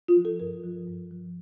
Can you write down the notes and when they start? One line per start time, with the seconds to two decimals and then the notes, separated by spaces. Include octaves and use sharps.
0.08 F4
0.16 F3
0.25 A4
0.40 G2 A#4
0.64 F3
0.87 G2
1.11 F3